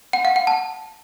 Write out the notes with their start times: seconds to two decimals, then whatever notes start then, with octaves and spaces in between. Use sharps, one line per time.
0.13 F#5
0.25 F5
0.36 F#5
0.47 A5